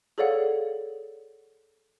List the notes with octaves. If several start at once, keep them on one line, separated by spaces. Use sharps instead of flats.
G#4 A4 C#5 D5 F5 F#5